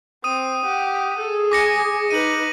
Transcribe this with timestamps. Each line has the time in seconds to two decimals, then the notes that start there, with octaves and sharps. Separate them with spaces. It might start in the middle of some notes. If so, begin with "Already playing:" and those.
0.24 C4 D#6 D#7
0.65 G4 F#5
1.18 G#4 A4
1.52 G#5 D6 A#6 C#7
2.10 D#4 B4 D#7 F#7